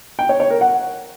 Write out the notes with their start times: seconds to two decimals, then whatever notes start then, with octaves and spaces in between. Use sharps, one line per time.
0.19 G5
0.29 C#5
0.40 C#5
0.50 A#4
0.61 F#5